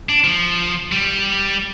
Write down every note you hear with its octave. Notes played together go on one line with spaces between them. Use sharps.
D4
F3
G3